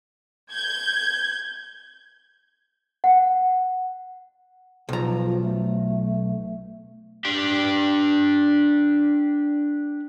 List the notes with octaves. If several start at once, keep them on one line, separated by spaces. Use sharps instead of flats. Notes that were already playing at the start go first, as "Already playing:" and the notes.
G6 G#6
F#5
B1 F3 A#5
A3
D4 G4